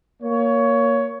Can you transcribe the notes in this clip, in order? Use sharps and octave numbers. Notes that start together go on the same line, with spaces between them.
A#3 C#5